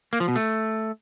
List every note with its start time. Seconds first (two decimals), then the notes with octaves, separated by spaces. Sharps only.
0.13 A#3
0.20 F3
0.28 B2
0.36 A3